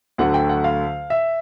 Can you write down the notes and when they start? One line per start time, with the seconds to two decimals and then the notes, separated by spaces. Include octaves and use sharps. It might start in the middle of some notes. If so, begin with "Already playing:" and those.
0.18 D2 D3 F#3 A3 F#5
0.34 G5
0.49 F#5
0.64 F5
1.10 E5